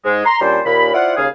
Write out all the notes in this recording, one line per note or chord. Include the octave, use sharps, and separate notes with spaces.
G#2 G#3
A#5 C6
A#2 G3 C#4 D4 C5
D#2 A#2 B5
E4 F4 C5 D5 F#5
D#2 C#3 G#4 F5